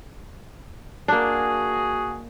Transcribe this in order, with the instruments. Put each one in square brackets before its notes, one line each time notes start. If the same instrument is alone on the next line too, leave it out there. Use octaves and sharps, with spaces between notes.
[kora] A#3 D4 [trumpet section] F#4 G#4